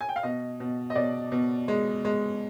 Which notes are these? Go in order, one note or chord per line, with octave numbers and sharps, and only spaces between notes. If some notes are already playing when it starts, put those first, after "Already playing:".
G#5
G5
F5
B2 D#5
B2
D#5
B2 D5
B2
G#3
G#3